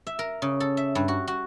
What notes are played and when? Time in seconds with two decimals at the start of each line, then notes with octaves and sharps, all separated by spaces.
0.07 E5
0.19 A#4
0.42 C#3
0.60 A4
0.77 E5
0.95 G2
1.08 F#4
1.27 F#4